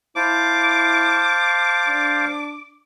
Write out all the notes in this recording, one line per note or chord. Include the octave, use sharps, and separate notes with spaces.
E4 C5 F5 A5 D6
D4